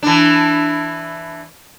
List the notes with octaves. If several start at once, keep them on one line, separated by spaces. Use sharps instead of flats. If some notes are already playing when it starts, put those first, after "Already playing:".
E3 D4